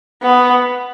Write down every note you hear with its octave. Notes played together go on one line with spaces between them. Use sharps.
B3